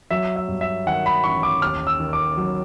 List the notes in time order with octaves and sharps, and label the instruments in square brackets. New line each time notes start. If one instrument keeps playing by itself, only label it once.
[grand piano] F#3 E5
E5
G2
E5
D#3 F#5
B5
A1 C#6
D6
D#2 F6
E6
D#3
D6
F#3